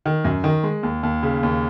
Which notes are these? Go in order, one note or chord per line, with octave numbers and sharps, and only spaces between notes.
D#3
F#2
D#3
G#3
D#2
D#2
C#3
D#2